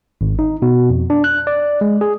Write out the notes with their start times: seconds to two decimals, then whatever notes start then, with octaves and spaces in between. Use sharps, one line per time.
0.21 G#1
0.39 D#4
0.62 B2
0.90 F2
1.10 D4
1.24 F#6
1.47 D5
1.81 G#3
2.01 G#4